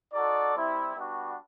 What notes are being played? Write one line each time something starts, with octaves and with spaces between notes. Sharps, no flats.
D#4 F#4 A4 D5
G3 C4 E4
G3 B3 D4 F#4